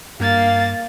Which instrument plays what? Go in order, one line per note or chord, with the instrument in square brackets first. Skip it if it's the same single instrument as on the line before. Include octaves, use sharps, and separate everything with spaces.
[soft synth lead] G2 [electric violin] A#3 A6 [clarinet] F5